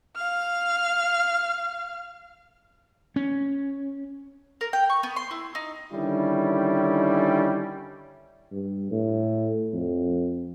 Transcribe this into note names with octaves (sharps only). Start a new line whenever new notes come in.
F5 F6
C#4
A#4
G5
C#6
B3
C6
E4
D#4
D3 D#3 G3 C#4 E4
G2
A2
F2